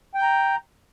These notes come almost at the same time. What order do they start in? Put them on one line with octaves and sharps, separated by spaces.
G5 G6 A#5